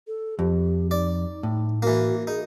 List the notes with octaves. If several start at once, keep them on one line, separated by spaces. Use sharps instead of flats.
A4
F2 G4
D#4 D5
A2
E3 A#3 F#4
D#4 G#4